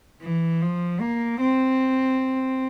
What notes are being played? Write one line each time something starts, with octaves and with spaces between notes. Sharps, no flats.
E3
F3
A#3
C4